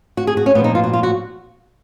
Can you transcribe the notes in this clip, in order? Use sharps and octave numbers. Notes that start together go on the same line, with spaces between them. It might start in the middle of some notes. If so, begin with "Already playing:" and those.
F#4
G#4
F#4
C#4
A#2 F3 B3
D#4
F4
F#4
F4
F#4